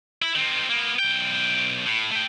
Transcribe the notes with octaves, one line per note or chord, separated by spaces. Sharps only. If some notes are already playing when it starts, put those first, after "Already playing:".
E4
D#3 C4
A#3 B3
B1 G5
A2
A3 G5